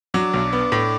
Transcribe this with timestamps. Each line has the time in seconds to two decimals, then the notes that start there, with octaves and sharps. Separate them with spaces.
0.14 F#3 D4
0.34 B1
0.53 B3
0.72 A2